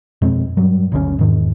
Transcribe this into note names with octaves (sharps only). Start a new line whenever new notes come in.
F2 B2 G#3 C4
G2 F#3
G1 D2 B2 C#4
E2 G#2 D#3